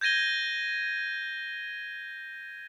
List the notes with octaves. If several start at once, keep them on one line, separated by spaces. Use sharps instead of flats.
G6 G#6 A#6 D#7 G7